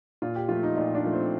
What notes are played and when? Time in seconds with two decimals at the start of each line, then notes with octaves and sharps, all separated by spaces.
0.22 A#2 F4
0.35 G4
0.49 F3 A3 F4
0.63 D#4
0.76 A#2 D#4
0.95 D4
1.05 F3 A3
1.13 C4